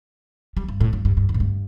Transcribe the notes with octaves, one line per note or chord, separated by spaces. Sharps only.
G3
G2
A2
G2
G2
G2
E2
A2
G2